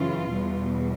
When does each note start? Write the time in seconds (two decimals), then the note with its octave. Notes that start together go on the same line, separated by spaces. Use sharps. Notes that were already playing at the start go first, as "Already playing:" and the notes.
Already playing: F#2 C#3 E3 F4
0.30 E2 B2 G3